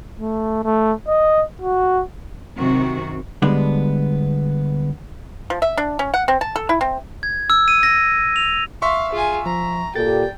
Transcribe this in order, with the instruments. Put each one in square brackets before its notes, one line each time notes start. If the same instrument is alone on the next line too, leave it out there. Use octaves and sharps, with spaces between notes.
[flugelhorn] A3
A3
D#5
F#4
[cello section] F#2 C3 D#3 C4 F#4
[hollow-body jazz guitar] D3 G3 G#3 B3 D4
[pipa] F3
E5
D4
C#4
F#5
C4
A5
A4
E4
C4
[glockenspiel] G#6
E6
D#7
A#6
F7
[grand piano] E5 C6 C#6 [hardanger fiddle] F5
[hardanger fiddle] F4 G#5 [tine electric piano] G#4
[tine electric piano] F3 [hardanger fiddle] A#5
[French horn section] A#2 G4 A4 [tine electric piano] D5 A6 [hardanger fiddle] G5